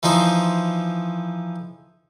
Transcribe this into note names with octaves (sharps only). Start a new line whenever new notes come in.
E3 F3 D#4 C5